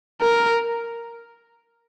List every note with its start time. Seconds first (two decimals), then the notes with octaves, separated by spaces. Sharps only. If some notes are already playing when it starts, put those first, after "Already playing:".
0.21 A#4